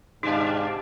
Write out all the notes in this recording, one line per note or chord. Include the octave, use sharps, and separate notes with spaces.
G#2 B2 D4 D#4 G4 F5 A5 D6